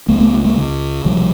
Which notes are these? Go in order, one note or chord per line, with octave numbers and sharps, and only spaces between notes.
C#2 C#3 A3 B3
A3 B3
G#3 A#3
C#2 C#3
C2 B2 F3 G3